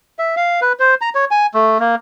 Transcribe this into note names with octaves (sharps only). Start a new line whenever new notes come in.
E5
F5
B4
C5
A#5
C#5
G#5
A3
A#3